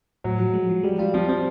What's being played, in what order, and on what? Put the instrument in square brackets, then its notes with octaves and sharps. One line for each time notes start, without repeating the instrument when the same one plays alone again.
[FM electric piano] A2 [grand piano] F#3
[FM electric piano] F3
G#3
F3
[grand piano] G3 [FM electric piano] G#3
[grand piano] G3 [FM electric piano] F4
[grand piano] F3 [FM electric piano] C4
[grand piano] F3 [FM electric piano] C4